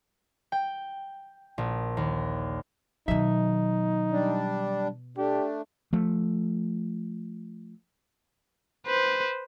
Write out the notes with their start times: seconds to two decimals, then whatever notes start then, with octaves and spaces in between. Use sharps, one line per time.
0.52 G5
1.58 A#1
1.97 D#2
3.08 B2 D#3 F#3 D#4 E5
4.11 G3 D4
5.17 A3 D4 G4
5.93 F3 A3
8.87 B4 C5